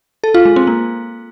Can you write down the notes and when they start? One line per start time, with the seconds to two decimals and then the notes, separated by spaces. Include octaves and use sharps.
0.24 A4
0.34 F4
0.45 G#3
0.56 C4
0.67 A#3